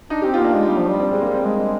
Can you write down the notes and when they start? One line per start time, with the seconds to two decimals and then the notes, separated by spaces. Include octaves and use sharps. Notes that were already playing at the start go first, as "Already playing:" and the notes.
0.10 D4 D#4
0.22 G4
0.26 C4
0.34 F4
0.41 A#3 D4
0.56 G#3
0.67 G3
0.79 F3
0.90 G3
1.00 C4
1.11 G#3
1.22 A#3
1.34 C4
1.45 G#3 D4